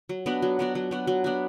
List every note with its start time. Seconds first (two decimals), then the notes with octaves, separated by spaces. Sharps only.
0.09 F#3
0.26 B3 D4 F#4
0.42 F#3
0.59 B3 D4 F#4
0.75 F#3
0.91 B3 D4 F#4
1.07 F#3
1.24 B3 D4 F#4